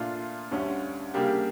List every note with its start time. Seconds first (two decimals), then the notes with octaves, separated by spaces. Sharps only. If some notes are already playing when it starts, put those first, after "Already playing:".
Already playing: A#2 A3 D4 F4
0.51 D2 D3 G3 C#4
1.14 C#3 G3 A#3 D4 G4